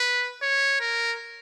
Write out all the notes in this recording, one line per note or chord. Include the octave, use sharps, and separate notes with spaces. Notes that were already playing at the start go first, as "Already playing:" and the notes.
Already playing: B4
C#5
A#4